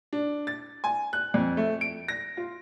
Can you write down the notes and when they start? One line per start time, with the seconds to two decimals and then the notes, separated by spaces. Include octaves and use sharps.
0.13 D4
0.47 A6
0.84 G#5
1.13 F#6
1.34 F2
1.57 A3
1.81 D7
2.08 A#6
2.37 F4